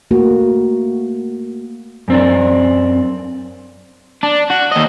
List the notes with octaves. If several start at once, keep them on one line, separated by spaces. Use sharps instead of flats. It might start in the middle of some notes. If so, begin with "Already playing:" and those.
A3 A#3 F#4
F#2 C4 D4
D4
F#4
D#2 D#5